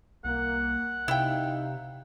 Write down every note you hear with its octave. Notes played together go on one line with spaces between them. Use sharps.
C2 A#3 F#5
C3 D#4 E4 F5 G5